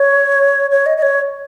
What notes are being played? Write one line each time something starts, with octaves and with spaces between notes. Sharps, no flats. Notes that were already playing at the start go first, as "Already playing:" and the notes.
Already playing: C#5
C#5
D#5
D#5
C#5